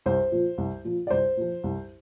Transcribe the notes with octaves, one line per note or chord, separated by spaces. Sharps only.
C2 C5
A#2 F3
C2
A#2 F3
D5
C2 C5
A#2 F3
C2